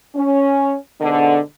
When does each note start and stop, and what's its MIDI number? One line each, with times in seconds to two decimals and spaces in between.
0.15 0.75 61
1.00 1.39 44
1.00 1.39 47
1.00 1.39 50